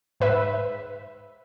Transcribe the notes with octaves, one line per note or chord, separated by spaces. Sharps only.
G#2 B4 E5